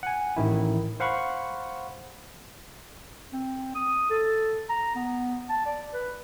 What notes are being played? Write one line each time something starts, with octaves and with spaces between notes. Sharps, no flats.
F#5 G#5
A1 D#3 E4
C5 F5 F#5 B5 C#6
C4
D#6
A4
A#5
B3
A5
D5
B4